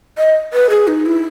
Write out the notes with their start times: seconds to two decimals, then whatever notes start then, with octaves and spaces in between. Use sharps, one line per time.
0.18 D#5
0.53 B4
0.70 G#4
0.87 D#4
1.06 E4